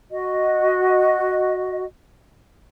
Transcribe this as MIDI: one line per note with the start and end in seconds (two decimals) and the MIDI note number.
0.12 1.85 66
0.12 1.85 75